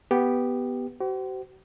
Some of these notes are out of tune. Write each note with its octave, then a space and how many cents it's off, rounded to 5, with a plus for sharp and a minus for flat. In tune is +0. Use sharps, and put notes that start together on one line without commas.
B3 +0 G4 +0
F#4 +45 C5 -25